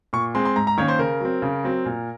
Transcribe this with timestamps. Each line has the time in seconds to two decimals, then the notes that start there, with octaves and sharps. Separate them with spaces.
0.13 A#2 C#6
0.35 G#3 C4 C6
0.45 C6
0.56 G#2 A#5
0.67 A#5
0.78 D#3 A#3 C#4 C#5
0.88 C5
0.99 C#3 A#4
1.20 F#3 C4
1.42 C#3
1.64 F#3 C4
1.86 A#2